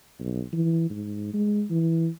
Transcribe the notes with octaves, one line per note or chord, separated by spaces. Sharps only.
B1
E3
G#2
G#3
E3